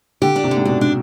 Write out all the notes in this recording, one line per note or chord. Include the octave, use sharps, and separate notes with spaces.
D3 G4
D4
C3
D3
G#2
B2 D4
D4